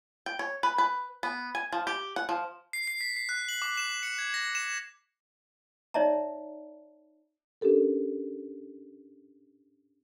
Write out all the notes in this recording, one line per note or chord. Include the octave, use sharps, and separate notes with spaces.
G5
C#5
B4
B4
B3
G#5
F3
G4
F#5
F3
C7
C7
B6
C7
F#6
F#7
D6
E7
C#7
G#6
A#6
E7
D#4 C#5 D5 E5 A5 A#5
C#4 D4 G4 A4 A#4